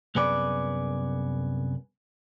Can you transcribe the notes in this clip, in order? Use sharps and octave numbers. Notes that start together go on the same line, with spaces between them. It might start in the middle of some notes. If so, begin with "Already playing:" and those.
C2 F#2 B3 G#4 B4 D5